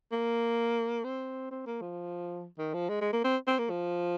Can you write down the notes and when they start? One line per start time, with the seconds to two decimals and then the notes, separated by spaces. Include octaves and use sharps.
0.12 A#3
1.04 C4
1.51 C4
1.66 A#3
1.81 F3
2.58 D#3
2.74 F3
2.89 G#3
3.01 G#3
3.12 A#3
3.24 C4
3.47 C4
3.58 A#3
3.70 F3